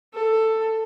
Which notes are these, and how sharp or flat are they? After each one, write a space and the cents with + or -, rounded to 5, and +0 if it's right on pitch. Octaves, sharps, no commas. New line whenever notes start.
A4 +10